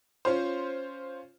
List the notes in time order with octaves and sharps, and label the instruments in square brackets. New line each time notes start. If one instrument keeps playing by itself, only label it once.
[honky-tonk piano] C#4 F4 C5